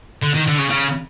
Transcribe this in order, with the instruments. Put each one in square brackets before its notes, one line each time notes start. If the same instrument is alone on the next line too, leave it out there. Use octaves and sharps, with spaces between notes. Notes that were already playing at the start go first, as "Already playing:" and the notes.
[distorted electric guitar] D3
D#3
D3
C#3
C#3